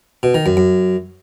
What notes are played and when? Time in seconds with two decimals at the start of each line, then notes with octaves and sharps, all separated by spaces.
0.23 B2
0.35 D#3
0.46 F#2
0.57 F#2